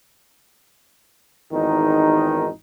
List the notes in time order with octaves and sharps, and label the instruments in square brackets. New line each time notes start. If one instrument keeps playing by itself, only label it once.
[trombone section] G#1 E2 D#3 D#4